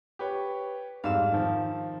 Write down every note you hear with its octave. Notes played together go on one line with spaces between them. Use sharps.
G4 B4 C#5
F2 G#2 G3 F5 E6
D#3 F3